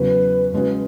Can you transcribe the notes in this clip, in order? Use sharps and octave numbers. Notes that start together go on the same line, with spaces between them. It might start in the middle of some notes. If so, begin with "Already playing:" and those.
Already playing: E2 C#3 F#3 B4
C#3 G#3 C#4 F#4